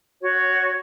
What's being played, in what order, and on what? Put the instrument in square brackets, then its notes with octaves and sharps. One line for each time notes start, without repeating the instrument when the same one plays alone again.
[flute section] F#4 C#5